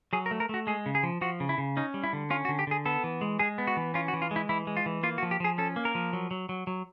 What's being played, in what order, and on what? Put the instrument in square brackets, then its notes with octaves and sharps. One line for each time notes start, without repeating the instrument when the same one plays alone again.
[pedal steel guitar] F#3 G#4
A#4
A3
A#4
A3 F#4
G#3 G#4
C#3
G#4
F3
F3 F#4
C#3
E4
C#3
C#4 D#4
G3
E4
D3
C#4 F4
F#4
D3
G4
D3 G#4
B3 A4
E3
G#3
G#3 G#4
B3
F#4
E3
C#4 F4
F#4
E3
F4
G#3
E4
E3 E4
G#3
F4
E3
A#3 F4
F#4
F3
G4
F3 G#4
C#4 A4
A#3
A#4
F3
F#3
F#3
F#3
F#3